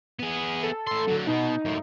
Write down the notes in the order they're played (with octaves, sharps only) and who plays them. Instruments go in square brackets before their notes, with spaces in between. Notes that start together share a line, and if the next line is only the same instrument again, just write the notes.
[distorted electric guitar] B3 G#4
[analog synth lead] A4
[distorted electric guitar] A2 C6 [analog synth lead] A4
[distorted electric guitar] D3 F#3
[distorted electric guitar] B2 B3 [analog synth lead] D#4
[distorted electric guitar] F#2 A2